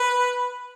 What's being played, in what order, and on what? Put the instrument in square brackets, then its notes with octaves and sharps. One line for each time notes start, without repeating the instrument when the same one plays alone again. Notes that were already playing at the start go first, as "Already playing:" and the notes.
Already playing: [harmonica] B4